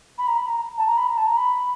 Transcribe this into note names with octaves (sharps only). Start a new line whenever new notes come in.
B5
A#5
B5
A#5
A5
A#5
B5
A#5
A5
A#5
B5